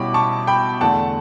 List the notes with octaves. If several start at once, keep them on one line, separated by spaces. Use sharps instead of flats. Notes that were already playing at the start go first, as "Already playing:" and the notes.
Already playing: B2 G3 C#4 E4 B5 D6
A5 C#6
G5 B5
E2 D3 A3 F#5 A5